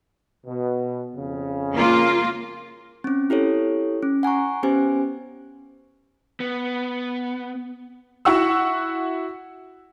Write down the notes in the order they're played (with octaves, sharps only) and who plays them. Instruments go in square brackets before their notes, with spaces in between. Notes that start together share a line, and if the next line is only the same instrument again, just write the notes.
[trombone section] B2
F2 C#3
[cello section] A#3 F4
[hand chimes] C4 C#4
E4 G4 A4 C#5
C#4
F#5 G#5 A#5 C#6
B3 C#4 G4 C5 G#5
[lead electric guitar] B3
[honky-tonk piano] E4 F#4 F#5 C#6 E6